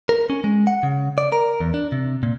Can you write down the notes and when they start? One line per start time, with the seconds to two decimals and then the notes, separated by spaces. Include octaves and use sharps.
0.09 A#4
0.30 C#4
0.44 G#3
0.67 F#5
0.83 C#3
1.18 D5
1.32 A#4
1.60 E2
1.74 D4
1.92 C3
2.23 A#2